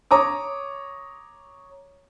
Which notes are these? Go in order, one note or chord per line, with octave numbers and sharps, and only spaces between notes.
C#5 A#5 D6 D#6